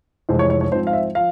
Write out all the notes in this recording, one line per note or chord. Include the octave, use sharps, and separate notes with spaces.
F1 F2 E3 G#3 C5
C#5
C#5
C#5
G#2 F3 C4 C5
F5
E5
F3 F5